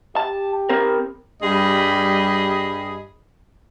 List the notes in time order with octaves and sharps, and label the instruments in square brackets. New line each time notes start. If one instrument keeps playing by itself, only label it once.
[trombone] G4 [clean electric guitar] A5
[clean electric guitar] C4 A#4
[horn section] G2 G3 G#4 D#5 B5